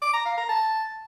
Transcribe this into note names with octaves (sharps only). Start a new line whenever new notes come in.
D6
A#5
F5
A#5
A5